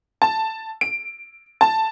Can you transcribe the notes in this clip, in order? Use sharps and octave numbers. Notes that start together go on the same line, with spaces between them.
A5
D7
A5